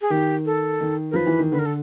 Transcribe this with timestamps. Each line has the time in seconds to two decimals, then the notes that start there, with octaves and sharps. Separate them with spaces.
0.01 G#4
0.10 D#3 G4
0.46 A4
0.81 D#3
1.11 A#4
1.13 F3 B4
1.27 E3
1.39 D#3
1.51 D3 B4
1.59 A#4
1.66 A4